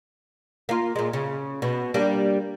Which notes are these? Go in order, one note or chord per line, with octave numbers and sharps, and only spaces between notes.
A#3 F4
A#2 G#3
C#3
B2
G3 A#3 D4